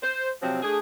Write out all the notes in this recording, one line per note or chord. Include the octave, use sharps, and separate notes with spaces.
C5
C3 F3 F#3 C4
A3 D4 G#4